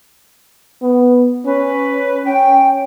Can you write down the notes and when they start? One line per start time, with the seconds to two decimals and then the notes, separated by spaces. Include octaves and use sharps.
0.82 B3
1.45 C#4 B4
2.25 C#4 G5